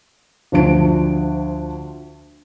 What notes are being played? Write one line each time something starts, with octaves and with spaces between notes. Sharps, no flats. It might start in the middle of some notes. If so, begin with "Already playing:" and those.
D2 F3 D4 D7